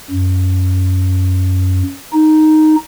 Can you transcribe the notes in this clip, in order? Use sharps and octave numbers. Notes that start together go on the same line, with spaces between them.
F#2
D#4